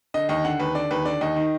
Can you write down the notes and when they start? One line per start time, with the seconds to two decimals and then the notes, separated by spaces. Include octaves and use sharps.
0.14 D3 D#5
0.29 D#2 D#5
0.45 D3 F#5
0.59 D#2 B4
0.75 D3 D5
0.91 D#2 B4
1.05 D3 D5
1.21 D#2 D#5
1.36 D#3